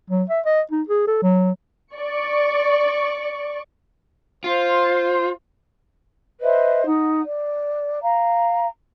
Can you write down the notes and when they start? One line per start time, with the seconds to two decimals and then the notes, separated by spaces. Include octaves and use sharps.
0.10 F#3
0.29 E5
0.45 D#5
0.71 D#4
0.88 G#4
1.07 A4
1.23 F#3
1.95 D5 C#6
4.44 F4 C5
6.41 B4 C5 D#5 E5
6.85 D#4 F#5
7.25 D5
8.01 F5 A#5